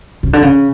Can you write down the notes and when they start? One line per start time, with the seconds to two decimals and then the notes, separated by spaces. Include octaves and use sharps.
0.23 C#3
0.33 D3
0.42 C#3